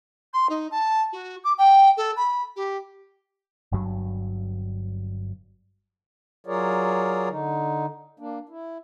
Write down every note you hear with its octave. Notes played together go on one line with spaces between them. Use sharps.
C6
D#4
A5
F#4
D6
G5
A4
B5
G4
G1 G2 F#3
F#3 F4 G#4 A#4 C#5 D5
D3 D#4
A#3 D4
E4